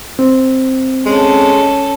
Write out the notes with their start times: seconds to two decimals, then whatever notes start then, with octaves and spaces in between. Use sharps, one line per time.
0.19 C4
1.06 G#3 C#4 A4